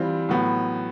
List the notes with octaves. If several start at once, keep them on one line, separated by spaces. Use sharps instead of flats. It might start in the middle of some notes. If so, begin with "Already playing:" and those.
Already playing: E3 G3 C4 F4
A2 F#3 B3